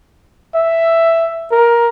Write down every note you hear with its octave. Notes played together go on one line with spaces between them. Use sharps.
E5
A#4